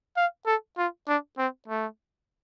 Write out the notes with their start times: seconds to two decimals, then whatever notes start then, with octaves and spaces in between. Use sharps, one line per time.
0.17 F5
0.46 A4
0.77 F4
1.08 D4
1.38 C4
1.68 A3